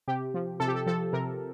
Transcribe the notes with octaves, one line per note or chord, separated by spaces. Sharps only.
C3 G4
F3
C3 A4
G4
A4
F3 A4
C3 A#4